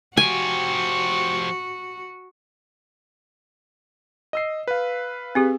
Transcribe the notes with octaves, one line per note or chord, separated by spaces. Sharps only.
F3 F#4 G4 G#5
D#5 E6 C7
B4 F5
C4 G4 G#4